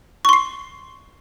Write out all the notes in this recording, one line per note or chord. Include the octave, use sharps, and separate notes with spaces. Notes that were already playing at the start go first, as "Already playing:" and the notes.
C6 C#6 C7